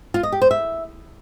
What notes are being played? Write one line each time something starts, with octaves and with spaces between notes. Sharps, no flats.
F4
D#5
G4
C5
E5